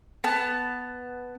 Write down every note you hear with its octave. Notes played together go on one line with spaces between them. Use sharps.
B3 A5